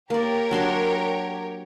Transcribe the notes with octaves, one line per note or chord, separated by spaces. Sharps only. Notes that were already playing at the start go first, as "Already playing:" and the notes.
A#3 G4 A#4 C#5 D5
F#3 D4 C6